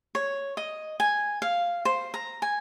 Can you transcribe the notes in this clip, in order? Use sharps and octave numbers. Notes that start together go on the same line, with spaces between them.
C#5
D#5
G#5
F5
C5
A#5
G#5